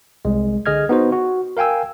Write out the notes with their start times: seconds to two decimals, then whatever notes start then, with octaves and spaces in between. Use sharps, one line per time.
0.25 C2 G#3
0.66 D3 G#4 D#5 F6 G#6
0.89 B3 D#4 F#4 C5
1.12 F#4
1.57 A#4 F5 G5 G#5 E6